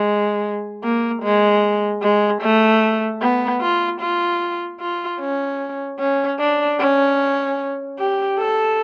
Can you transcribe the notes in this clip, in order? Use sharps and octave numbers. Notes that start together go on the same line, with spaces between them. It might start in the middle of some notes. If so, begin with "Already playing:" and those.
Already playing: G#3
A#3
G#3
G#3
A3
B3
F4
F4
F4
C#4
C#4
D4
C#4
G4
A4